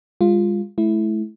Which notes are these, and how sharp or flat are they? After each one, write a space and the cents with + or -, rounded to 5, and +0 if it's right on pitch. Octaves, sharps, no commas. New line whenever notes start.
G#3 -40 F4 +0
A3 -40 E4 +0